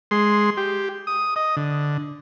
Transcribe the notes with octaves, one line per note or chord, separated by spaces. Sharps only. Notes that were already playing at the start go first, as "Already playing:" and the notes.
G#3 C6
G4
D#6
D#5
D3